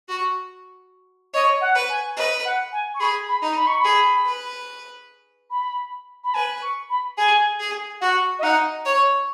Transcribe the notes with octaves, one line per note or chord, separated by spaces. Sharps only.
F#4
C#5 D#5
F#5
B4
G#5
B4 D#5
F#5
G#5
C#6
G#4 B5
B5
D#4
B5
C#6
B5
G#4
B4
B5
B5
B4 G#5
C#6
B5
G#4 G#5
G#4
F#4 F#5
D#5
D#4 F#5
C#5